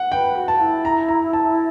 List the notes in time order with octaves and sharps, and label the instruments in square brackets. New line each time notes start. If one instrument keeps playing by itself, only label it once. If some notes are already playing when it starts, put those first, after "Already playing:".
Already playing: [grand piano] F#5
[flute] B4 [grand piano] G5
[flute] F#4
[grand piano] A5
[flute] E4
[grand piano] A#5
A#5
A5